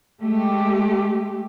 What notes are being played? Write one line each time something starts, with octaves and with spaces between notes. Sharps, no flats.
G#3 A3 G4